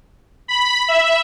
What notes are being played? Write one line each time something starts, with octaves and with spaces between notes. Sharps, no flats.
B5
E5